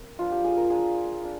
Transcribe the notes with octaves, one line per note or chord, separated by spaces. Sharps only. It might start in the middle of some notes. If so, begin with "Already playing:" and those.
Already playing: C4 A#4
F3 A#3 D4 F4
G4
G#4
A#4
A#3 D4 F4 G#4
D4 F4